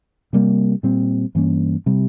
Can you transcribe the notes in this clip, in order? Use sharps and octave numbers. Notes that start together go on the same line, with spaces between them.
C3 G3 A#3
A#2 G3 C4
G2 E3 A#3 C#4
C3 G3